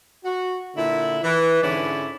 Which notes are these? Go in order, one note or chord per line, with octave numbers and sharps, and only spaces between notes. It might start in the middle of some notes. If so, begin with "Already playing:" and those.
F#4
A#2 D3 E4
E3
G#2 D3 C#4 E4 D5